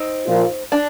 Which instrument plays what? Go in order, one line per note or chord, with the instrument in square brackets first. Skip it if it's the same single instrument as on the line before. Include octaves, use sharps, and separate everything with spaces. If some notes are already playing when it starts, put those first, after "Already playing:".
Already playing: [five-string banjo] C4 D#4
[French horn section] A#2 F3 A#3 F4
[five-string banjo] D4